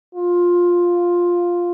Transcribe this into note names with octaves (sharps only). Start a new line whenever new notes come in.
F4